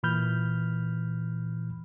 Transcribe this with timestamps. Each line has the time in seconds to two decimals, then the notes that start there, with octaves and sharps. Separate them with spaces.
0.03 A#2 E3 B5 F6 G6